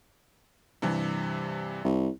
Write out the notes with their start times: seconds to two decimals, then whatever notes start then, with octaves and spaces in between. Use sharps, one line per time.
0.82 G2 C3 E3
1.85 C2